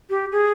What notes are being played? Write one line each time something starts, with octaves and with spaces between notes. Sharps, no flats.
G4
G#4